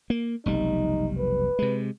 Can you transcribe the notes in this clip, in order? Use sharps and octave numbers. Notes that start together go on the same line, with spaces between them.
A#3
F1 B1 G3 D#4
B4
C3 G#3